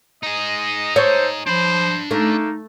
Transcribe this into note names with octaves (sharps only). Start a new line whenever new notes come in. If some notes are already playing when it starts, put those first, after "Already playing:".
D#4 G#4 D#5
A4 C5 C#5
F3 D4 C5 B5
A3 A#3 D#4